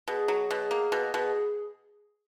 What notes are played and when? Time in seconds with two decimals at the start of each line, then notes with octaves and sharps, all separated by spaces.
0.08 B2 G#4
0.28 F#3
0.51 B2
0.71 A#3
0.92 B2
1.14 B2